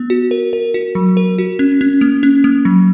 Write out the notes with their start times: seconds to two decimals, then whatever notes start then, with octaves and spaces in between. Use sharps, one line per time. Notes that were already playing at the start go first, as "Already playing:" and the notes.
Already playing: B3
0.10 F#4
0.31 A#4
0.53 A#4
0.74 F#4
0.95 F#3
1.17 A#4
1.38 F#4
1.59 C#4
1.81 C#4
2.01 A#3
2.23 C#4
2.44 A#3
2.65 F#3